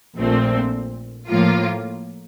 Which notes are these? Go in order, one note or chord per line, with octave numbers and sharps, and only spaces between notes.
A#1 A#2 A3 C4
A2 F3 A#3 F4